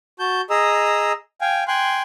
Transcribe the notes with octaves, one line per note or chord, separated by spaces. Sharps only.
F#4 A5 G6
G#4 D#5 A#5 D#6 E6
F5 G5 G#5
G5 G#5 C6 F#6